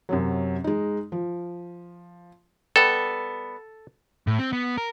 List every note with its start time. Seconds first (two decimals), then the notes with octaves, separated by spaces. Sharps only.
0.09 F#2 C3 F#3
0.64 G#3 D#4
1.12 F3
2.76 G3 B3 A4
4.27 A2
4.39 C4
4.53 B3
4.77 A#4